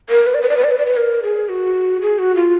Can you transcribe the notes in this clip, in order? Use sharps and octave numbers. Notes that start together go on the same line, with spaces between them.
A#4
B4
D5
B4
D5
B4
D5
B4
D5
B4
A#4
G#4
F#4
G#4
F#4
F4